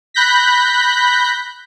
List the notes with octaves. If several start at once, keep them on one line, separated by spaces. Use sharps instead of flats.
B5 F#6 G6 A#6 B6